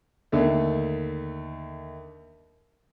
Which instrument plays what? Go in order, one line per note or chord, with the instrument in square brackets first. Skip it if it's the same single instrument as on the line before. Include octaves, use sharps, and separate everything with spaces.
[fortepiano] D#2 D3 A3